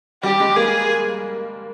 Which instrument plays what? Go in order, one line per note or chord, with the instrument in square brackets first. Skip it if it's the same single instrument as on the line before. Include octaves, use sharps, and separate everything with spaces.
[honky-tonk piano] G3 [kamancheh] G4
[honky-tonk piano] G#3
[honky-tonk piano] A#3 [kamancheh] G#4